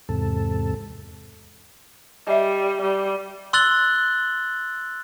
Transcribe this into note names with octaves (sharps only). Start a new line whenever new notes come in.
E2 G#2 C3 A4
G3 D#5 E5
G3
C6 E6 F#6 A6 F#7 G7